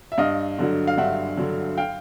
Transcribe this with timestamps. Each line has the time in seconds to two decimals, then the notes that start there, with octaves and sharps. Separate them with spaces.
0.12 E5
0.18 G2 D#5 F5
0.59 D3 F#3
0.88 F5
0.98 G2 E5 F#5
1.37 D3 F#3
1.78 F5 G5